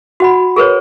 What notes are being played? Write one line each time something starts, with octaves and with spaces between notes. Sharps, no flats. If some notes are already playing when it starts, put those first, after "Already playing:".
F#4 F#5 B5
G#4 A#4 B4 C#5